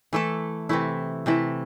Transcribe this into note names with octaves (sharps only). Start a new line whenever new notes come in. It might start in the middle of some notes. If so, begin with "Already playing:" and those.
E3 A3 E4 A4
C3 E3 A3 E4
C3 E3 A3 E4